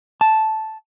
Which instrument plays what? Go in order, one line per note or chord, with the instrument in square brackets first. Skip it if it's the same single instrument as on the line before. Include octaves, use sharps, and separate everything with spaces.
[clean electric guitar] A5